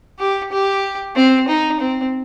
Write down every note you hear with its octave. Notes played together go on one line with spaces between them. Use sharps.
G4
G4
C4
D#4
C4